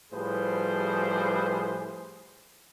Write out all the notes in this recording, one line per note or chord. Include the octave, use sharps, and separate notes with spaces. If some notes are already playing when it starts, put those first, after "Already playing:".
A2 F3 G3 G#4 B4 C5